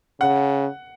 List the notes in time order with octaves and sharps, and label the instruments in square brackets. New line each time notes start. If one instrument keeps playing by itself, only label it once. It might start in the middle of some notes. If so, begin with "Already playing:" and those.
[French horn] C#3 [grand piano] F#5